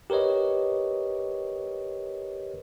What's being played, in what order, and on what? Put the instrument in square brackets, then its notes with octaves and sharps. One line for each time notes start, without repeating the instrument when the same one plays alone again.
[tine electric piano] G4 A#4 B4 C#5 D#5